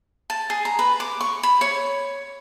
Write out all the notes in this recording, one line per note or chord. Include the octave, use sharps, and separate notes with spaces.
A5
G#4
A#5
B4
D6
C#6
B5
C#5